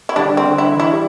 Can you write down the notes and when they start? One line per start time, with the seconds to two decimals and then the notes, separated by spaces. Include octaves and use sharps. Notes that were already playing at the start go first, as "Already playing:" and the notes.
0.09 E4
0.16 D3 G3 D4
0.37 C4
0.44 D3
0.58 E4
0.73 E3
0.80 E4
0.91 G3